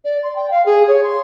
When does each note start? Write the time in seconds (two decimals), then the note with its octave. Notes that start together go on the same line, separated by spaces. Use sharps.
0.05 D5
0.23 C6
0.36 G5
0.51 F5
0.66 G#4
0.88 C#5
1.04 C6